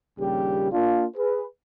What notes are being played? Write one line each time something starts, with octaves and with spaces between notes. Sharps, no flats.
A#1 D#2 C#3 G3 G4
A#3 D4 F4
G#4 B4